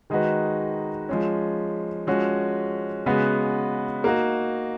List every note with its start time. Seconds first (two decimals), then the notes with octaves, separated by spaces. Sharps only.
0.10 D#3 G#3 D#4 F#4 B4
1.09 F3 G#3 C#4
2.07 F3 G#3 C#4 F#4
3.06 C#3 G#3 B3 F#4 B4
4.04 A#3 D#4 F#4